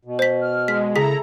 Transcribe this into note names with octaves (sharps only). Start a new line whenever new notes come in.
B2
C5 B6
F6
G#3 B6
C#3 E4 G#4 A4 A#5 B6